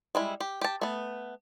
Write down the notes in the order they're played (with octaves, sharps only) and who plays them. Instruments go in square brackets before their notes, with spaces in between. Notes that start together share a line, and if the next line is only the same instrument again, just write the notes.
[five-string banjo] G3 G#3 E4
G4
G4 A5
A3 B3